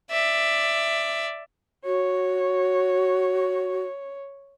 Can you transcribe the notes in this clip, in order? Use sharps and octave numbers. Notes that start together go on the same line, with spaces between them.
D5 E5
F#4 C#5